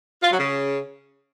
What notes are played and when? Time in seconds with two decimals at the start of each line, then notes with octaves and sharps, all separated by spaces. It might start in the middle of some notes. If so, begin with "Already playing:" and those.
0.23 F4
0.31 F#3
0.39 C#3